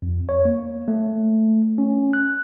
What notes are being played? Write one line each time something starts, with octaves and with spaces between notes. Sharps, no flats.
F2
C#5
A#3
A3
C#4
F#6